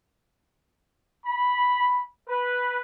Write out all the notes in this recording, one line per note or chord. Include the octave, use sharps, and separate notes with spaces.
B5
B4